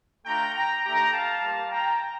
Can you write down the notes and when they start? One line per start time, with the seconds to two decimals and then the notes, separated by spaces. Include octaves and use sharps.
0.25 A3 D4 F4 G5 A#5
0.54 G5 A#5
0.83 A3 D4 G4 G5 A#5
1.12 F5 A5
1.41 G3 A#3 F4
1.71 G5 A#5